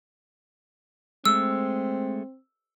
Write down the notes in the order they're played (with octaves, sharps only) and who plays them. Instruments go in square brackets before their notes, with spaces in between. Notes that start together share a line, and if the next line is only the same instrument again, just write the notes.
[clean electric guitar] G#3 A3 [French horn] C4 [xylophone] E6